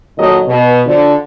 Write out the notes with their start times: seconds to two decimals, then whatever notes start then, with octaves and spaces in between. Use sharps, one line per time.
0.18 A#2 D#3 F#3 A4 D#5
0.47 B2
0.87 D3 F3